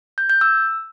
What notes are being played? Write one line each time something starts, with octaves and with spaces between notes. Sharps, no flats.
G6
G6
E6